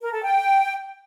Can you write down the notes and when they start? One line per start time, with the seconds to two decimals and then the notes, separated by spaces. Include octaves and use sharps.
0.01 A#4
0.12 A4
0.23 G5